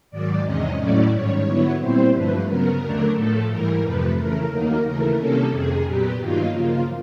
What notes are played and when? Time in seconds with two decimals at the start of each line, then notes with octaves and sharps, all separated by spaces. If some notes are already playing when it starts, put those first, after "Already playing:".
0.11 G#2 D#3 F#3 D5
0.45 E2 C3 D#3 G#3 C#4 D#5
0.78 A2 F#3 A3 C#4 E4 D5
1.12 G#2 D#3 G3 C#5
1.46 D3 F#3 B3 E4
1.80 A#2 G3 C4 E4 C5
2.14 G2 D3 F3 A3 B4
2.47 C#3 F#3 B3 A#4
2.81 D#2 D3 F#3 A3 D4
3.15 A2 F3 A3 A4
3.49 G#2 E3 G3 A#4
3.83 F2 C3 F3 A3 B4
4.17 C#3 E3 A3 A#4
4.50 D#2 D#3 F#3 A#3 D#4
4.84 D#2 C#3 E3 A3 A#4
5.17 C3 D#3 G3 A#3 C#4 A4
5.52 F2 C3 D#3 G#4
5.85 A#2 F#3 B3 G4
6.19 G2 D#3 F#3 A#3 D#4 F4
6.53 C#3 F3 A#3 F4